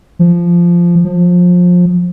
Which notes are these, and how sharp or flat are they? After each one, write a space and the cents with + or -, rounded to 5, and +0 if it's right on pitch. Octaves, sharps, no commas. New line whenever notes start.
F3 -10
F3 +25